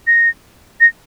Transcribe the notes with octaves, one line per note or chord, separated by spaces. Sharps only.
A#6
A#6